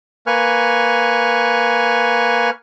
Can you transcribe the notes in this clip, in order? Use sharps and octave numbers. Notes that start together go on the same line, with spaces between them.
A#3 B4 G#5 C#6 F6